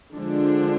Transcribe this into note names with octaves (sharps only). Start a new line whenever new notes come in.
D3 F3 G#3 D4